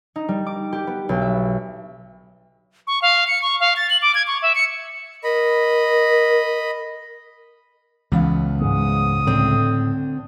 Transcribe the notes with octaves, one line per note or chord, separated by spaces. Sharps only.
D#4
G3
D6
G4
B3
B1
E5
C#6
F5
C#7
C#6
F5
A6
F#7
D6
G#6
C#6
E5
C#7
A#4 D#5 B5
C#2 E3 B3 F5
G#2 G#3 D#6
A2 D3 C4 D4